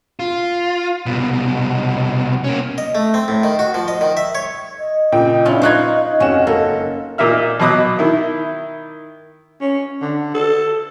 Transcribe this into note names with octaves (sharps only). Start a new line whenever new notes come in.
F4
C2 B2
A#3 C#4
D#5
A3
C4
A2
D#3
F#4
F3
D#5
D#3
E5
C#5
D#5
A#2 C#3 G5
C#4 D4 E4 F4
D#4 F4 C5 C#6 F#6 G#6
F1 C#4 F#4 E7
F#1 A#3 A4
A#2 A#3 D#4 E5 F6
B2 F#3 D#5 D6 D#6 F#6
D#3 E4
C#4
D3
A4